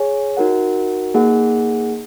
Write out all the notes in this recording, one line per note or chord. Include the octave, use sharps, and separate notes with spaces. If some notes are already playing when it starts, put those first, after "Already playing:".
Already playing: G#4 C#5 G#5
D#4 F#4 A#4 F#5
A#3 D#4 G#4 F#5